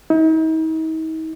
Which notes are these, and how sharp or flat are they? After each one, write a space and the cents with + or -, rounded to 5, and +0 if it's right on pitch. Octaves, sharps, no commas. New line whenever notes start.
D#4 +45